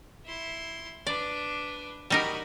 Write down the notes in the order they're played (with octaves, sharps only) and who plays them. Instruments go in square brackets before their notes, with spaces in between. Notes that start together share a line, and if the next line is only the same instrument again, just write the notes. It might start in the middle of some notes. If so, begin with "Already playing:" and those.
[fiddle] E4 C6
[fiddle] D4 B4 [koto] D5
[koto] G3 D#4 A#4 [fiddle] F#4 B5